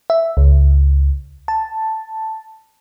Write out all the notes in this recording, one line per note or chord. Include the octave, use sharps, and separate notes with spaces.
E5
C#2
A5